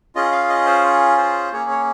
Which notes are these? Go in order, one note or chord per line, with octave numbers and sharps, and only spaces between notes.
C#4 F4 G#4 D#5
F5
D#5
C5
C5
A#3 C#4 G#4 C#5
C#5